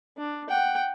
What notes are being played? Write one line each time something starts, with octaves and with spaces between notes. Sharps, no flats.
D4
F#5 G5